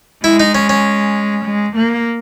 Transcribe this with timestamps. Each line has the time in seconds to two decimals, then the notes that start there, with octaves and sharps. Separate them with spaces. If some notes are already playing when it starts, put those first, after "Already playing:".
0.24 G#3 E4
0.40 D#4
0.55 C#4
0.69 C#4
1.45 G#3
1.77 A#3